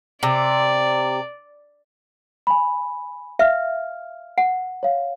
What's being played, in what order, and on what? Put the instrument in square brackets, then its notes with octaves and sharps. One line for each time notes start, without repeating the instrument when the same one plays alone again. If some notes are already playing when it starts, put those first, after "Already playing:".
[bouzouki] C3 [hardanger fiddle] D5
[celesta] G#5 B5
[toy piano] E5 [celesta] F5 F6
[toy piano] F#5
[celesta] C#5 F5